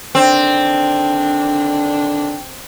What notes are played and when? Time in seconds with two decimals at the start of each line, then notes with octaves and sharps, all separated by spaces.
0.15 D3 D#3 C4 D4